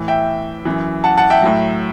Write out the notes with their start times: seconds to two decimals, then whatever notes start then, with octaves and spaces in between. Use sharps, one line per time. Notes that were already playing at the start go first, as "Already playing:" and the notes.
Already playing: A2 E3
0.08 E5 G5
0.65 F#2 E3
1.04 F#5 A5
1.17 F#5 A5
1.30 E5 G5
1.42 A2 F#3